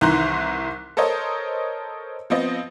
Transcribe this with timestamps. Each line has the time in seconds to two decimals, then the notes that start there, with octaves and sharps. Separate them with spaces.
0.01 C2 D#3 E3 A#5 C6 F#6
0.97 A4 A#4 C5 C#5 D#5
2.30 F3 B3 C4 D#5